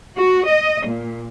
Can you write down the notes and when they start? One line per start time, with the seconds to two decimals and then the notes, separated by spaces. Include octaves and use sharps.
0.16 F#4
0.47 D#5
0.86 A#2